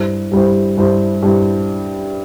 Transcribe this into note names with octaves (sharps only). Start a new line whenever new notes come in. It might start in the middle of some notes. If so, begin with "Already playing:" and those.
Already playing: G2 G3 E4 C5
G2 G3 E4 C5
G2 G3 E4 C5
G2 G3 E4 C5